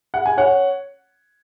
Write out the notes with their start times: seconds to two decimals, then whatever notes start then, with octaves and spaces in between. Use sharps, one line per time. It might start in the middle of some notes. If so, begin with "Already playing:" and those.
0.14 F#5
0.26 G#5
0.38 C#5 F#5